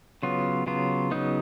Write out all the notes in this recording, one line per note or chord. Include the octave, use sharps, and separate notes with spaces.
C#3 F#3 B3 F4
C#3 F#3 B3 F4
C#3 F#3 B3 D#4